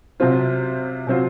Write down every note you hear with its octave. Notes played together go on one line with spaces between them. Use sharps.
C3 F#3 C4 F4 C5
C3 F#3 C4 F4 C5